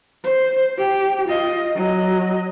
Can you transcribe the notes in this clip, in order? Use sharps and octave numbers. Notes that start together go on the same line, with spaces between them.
C5
G4
F4 D#5
F#3 D#5